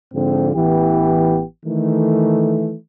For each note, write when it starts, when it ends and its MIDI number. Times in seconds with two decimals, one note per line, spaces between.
0.14 0.50 44
0.14 0.50 50
0.14 0.50 53
0.14 0.50 60
0.55 1.43 33
0.55 1.43 52
0.55 1.43 59
0.55 1.43 67
1.66 2.76 51
1.66 2.76 52
1.66 2.76 57